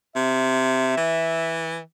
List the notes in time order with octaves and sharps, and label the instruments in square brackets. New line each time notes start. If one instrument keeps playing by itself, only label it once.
[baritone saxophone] C3 [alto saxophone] E5
[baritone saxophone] E3